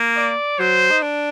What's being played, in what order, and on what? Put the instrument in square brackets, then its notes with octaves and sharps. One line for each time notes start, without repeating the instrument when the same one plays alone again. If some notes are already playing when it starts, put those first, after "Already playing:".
Already playing: [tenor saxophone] A#3
[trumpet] D5
[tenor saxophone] F#3 [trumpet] C5
[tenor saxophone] D#4
D4